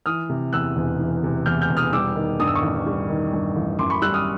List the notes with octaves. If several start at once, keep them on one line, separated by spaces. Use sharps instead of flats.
E3 D#6 F6
C3
E2 E6 F#6
E1
E3
C3
E2 F6 G6
F6 G6
E1
D#6 F6
G3 D6 E6
D#3
G2 D#6
E6
C#6 D#6
A1
G3
D#3
G2
A1
F#2 C6 D6
B5 C#6
G3 E6 F#6
D#6 F6